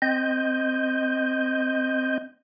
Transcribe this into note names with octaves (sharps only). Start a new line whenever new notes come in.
C4 D#5 G6